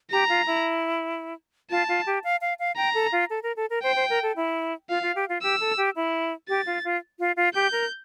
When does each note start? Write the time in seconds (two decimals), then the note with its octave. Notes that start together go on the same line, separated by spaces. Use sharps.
0.12 G4 A#5
0.29 F4
0.47 E4
1.71 F4 A5
1.89 F4
2.06 G4
2.24 F5
2.41 F5
2.59 F5
2.77 G5 A#5
2.94 A4
3.12 F4
3.30 A4
3.43 A#4
3.57 A4
3.70 A#4
3.83 C5 G5
3.96 C5
4.10 A#4
4.23 A4
4.36 E4
4.89 F4 F5
5.02 F4
5.15 G4
5.29 F4
5.42 G4 E6
5.60 A4
5.77 G4
5.96 E4
6.49 G4 A6
6.66 F4
6.84 F4
7.19 F4
7.37 F4
7.54 G4 G6
7.72 A#4